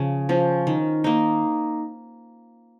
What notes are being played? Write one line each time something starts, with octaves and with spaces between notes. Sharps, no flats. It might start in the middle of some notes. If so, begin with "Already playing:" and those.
Already playing: C#3 F3 C#4
F3 C#4
D#3
A#3 D#4